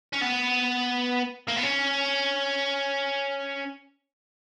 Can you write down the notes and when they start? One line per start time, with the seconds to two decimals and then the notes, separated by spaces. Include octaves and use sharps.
0.13 C#4
0.21 B3
1.48 A#3
1.57 B3
1.63 C#4